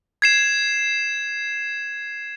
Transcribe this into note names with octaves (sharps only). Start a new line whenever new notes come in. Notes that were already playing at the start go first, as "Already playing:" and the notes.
G#6 C7 E7